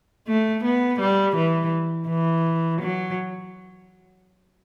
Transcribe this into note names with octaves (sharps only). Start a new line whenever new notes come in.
A3
B3
G3
E3
E3
F#3